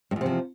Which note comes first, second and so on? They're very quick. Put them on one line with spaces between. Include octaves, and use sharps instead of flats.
G2 E2 C3 F3